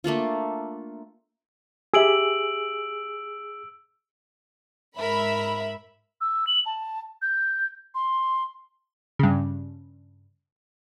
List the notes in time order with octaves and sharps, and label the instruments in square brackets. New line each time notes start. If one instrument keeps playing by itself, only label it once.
[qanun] A3 A#3 D4 F4
[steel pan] G4 E5 [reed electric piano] G#4 [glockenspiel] E6 D7 F#7
[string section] G#2 E5 B5 [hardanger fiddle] A#4
[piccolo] E6
F#7
A5
G6
C6
[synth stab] G2 C#3